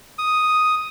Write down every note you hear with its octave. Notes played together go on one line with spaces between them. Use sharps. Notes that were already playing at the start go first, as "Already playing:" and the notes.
D#6